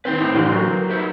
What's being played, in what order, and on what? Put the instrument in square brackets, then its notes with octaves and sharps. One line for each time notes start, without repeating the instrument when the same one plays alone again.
[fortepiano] D#3 C4 [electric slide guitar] B4 C5 G5
[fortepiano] A2
A1 D3 E3
F#3 A#3
[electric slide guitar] D#4 E4 G4